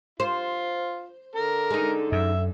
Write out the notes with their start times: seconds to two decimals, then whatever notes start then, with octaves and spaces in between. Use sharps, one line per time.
0.20 F4 C5
1.35 D3 A4 A#4
1.70 G#3 D#4
2.12 F#2 E5